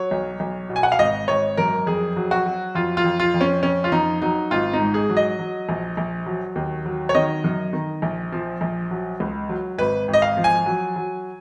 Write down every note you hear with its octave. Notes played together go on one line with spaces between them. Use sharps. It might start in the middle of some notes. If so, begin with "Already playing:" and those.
Already playing: F#3 C#5
B1
B1
B2
G#5
F#5
F5
G#1 D#5
G#1 C#5
F#2 A#4
F2 G#4
F#3
F#4
F#3
F2 F4
F4
F2
F4
F2
C#4
F2 C#4
F4
F2 D#4
F#3 D#4
G#1 F4
D#4
G#2
G#4
F#3
D#5
F#3
A#1
A#1
F#3
D#2
F#3
C#5
D#3 D#5
F#2
D#3
A#1
F3
A#1
F#3
C#2
F#3
G#1 B4
G#1
D#5
F5
F3
G#5
F#3
F#3